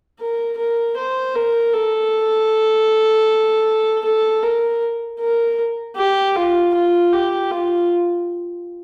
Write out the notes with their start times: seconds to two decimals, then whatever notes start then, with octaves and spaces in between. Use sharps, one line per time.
0.19 A#4
0.58 A#4
0.97 C5
1.35 A#4
1.74 A4
4.04 A4
4.43 A#4
5.20 A#4
5.97 G4
6.36 F4
6.74 F4
7.13 G4
7.51 F4